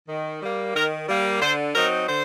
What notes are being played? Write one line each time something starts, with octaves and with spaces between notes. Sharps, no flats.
D#3
G3 A#3
D#3 A#4
G3 A#3
D3 C5
F#3 C4 D#4 A#4
D3 C5